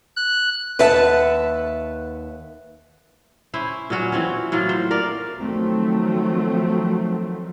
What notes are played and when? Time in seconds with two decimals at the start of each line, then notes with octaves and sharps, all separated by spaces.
0.16 F#6
0.79 D#2 B4 E5 F#5 A5
3.54 C#4 E4 C5
3.90 A#2 F#3 C#4 F#4
4.12 E3 C4 C#4
4.52 A2 F#3 A#3 F4
4.69 C5
4.91 A#4 D5 F5
5.38 D#3 F3 F#3 A3 C4